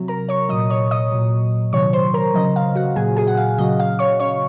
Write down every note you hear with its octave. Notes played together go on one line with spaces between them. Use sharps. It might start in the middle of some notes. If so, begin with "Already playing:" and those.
Already playing: C3 F#3
A#4 A#5
C#5 C#6
A#2 F#3 D#5 D#6
C#5 C#6
D#5 D#6
A#2 F#3
C3 D#3 F#3 C#5 C#6
C5 C6
A#4 A#5
C#3 F#3 D#5
F5
F#4 F#5
A#2 F#3 G#4 G#5
G#4 G#5
F#5
F5
C#3 F#3 D#5
F5
C#5 C#6
C#3 F#3 C#5 C#6